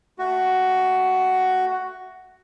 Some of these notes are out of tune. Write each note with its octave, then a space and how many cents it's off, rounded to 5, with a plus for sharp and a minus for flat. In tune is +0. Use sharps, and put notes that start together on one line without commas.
A3 +0 F#4 +10